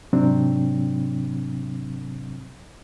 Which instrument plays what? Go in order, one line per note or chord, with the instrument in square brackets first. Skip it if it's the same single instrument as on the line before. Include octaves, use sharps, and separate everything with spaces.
[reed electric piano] G#2 C3 F#3 C4 D4